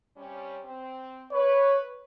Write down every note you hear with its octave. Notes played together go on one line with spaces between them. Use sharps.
C3 G3 C#4
C4
B4 C#5